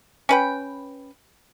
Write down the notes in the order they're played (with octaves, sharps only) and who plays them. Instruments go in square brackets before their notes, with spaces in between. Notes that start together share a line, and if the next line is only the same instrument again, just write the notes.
[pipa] C#4 B4 G5